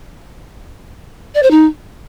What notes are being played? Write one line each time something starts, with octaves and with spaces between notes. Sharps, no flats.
D5
C5
D#4